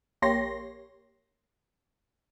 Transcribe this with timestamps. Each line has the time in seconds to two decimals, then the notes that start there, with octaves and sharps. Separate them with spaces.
0.22 A#1 A#3 G4 C#5 C6 A#6